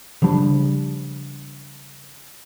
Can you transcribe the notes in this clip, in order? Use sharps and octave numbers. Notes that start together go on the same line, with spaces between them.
C#3 F3 G3 D4